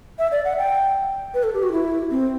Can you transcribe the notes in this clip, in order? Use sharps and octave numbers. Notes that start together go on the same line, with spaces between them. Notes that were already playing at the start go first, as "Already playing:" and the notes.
E5
D5
F#5
G5
B4
A4
G4
F#4
E4
C4